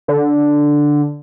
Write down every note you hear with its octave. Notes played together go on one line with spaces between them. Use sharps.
D3